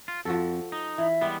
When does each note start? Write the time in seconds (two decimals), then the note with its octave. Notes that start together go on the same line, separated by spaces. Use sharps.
0.08 F4
0.25 F2 F3 F#4 A4
0.72 D#4
0.98 E3 E5
1.21 G3 G#3 B3